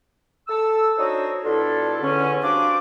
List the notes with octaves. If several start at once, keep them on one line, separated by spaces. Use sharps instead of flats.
A4 E6
D4 D#4 F#4 C5 C#5
B2 D4 E4 F4 A4
E2 D3 C#4
G3 C4 D4 F#4 F5 D6